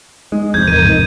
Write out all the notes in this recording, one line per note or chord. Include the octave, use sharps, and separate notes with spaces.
G#3 D#4
F1 F2 G6 G#6
E2 G#2 A#4 G#6 D#7
D#4